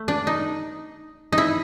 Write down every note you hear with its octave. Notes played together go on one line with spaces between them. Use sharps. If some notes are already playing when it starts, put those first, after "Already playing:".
Already playing: A3
D4
D#4
D#4
E4